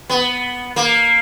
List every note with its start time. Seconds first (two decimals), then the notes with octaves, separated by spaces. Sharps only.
0.10 B3
0.76 A#3